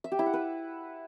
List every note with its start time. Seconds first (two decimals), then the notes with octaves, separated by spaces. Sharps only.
0.04 E5
0.12 G4
0.19 E4
0.26 F#5
0.34 B4